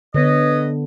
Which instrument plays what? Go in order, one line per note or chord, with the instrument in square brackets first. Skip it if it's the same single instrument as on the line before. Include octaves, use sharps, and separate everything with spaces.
[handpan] D3 B3 [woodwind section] B4 C#5 D#5